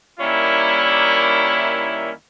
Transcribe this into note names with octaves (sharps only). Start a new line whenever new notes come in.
D#3 G3 A#3 C#4 E4